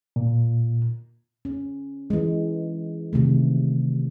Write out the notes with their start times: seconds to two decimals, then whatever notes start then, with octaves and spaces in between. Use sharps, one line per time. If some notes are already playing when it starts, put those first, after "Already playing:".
0.16 A#2
1.45 C#4
2.10 E3 G#3
3.13 C3 D#3 A3